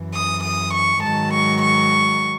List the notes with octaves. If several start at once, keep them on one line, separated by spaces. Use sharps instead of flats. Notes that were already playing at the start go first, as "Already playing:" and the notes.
Already playing: F#2 E3
D#6
D#6
C#6
G#2 D#3 F#3 A5
C#6
C#6